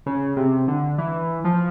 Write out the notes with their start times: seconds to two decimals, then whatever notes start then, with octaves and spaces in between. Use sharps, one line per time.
0.06 C#3
0.37 C3
0.68 D3
0.98 E3
1.44 F3